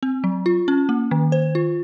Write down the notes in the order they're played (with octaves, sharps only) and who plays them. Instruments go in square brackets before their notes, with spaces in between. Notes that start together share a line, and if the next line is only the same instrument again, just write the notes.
[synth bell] C4
F#3
F4
C#4
A#3
D#3
C5
F4